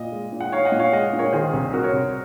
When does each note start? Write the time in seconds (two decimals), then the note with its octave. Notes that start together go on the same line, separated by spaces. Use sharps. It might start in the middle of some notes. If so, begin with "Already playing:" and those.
Already playing: A#2 D#5
0.12 G#3
0.33 A#2
0.41 F#5
0.52 D#4 C#5 F5
0.65 D#5 F#5
0.72 A#2
0.79 C#5 F5
0.92 G#3 D#5 F#5
1.13 A#2
1.19 A#4 C#5
1.33 D#3 G#4 C5
1.53 C2
1.73 C3 F#4 A#4
1.83 A#4 C#5
1.93 C2